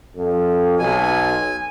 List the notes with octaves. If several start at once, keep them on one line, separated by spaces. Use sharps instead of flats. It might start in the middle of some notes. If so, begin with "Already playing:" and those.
F2
B1 G#5